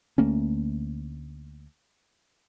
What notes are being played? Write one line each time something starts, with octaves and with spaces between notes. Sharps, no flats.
D2 A3 A#3 C#4